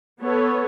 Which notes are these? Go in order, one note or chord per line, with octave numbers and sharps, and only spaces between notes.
B3 A4 C#5